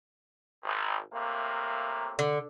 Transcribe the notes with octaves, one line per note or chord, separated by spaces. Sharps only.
G#1
A2 C3 A#3
D3